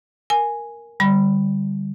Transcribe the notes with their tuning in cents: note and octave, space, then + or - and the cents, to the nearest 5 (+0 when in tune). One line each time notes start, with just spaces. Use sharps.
A#4 +0 G#5 +0
D3 +0 G3 +0 B5 +0